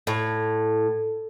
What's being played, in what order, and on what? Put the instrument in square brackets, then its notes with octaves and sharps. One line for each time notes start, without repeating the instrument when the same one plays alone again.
[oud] A2